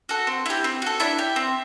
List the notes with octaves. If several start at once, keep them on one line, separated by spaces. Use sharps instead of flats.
F#4 A4
C4
E4 G4
C4
F#4 A4
D4 E4 E5
G4
C4